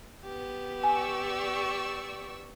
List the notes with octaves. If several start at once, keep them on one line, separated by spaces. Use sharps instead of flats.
B3 G4
D5 G#5 C#6 E6